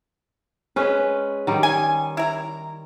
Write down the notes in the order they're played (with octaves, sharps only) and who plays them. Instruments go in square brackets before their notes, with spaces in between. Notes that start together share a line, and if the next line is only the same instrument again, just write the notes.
[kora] G#3 C#4 B4
D#3 G3
[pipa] G#5
E4 A#5